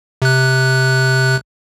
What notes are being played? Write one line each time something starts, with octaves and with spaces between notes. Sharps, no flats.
C3 F#6